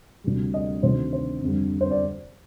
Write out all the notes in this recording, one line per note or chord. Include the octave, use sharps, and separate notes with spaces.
D2 C3 G3
D#5
D2 C3 D#3 C5
C5
F2 D3 G3
C5
D5